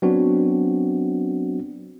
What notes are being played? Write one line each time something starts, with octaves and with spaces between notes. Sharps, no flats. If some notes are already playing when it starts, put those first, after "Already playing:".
F#3 B3 C4 D4 F#4